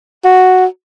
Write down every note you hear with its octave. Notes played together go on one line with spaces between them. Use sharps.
F#4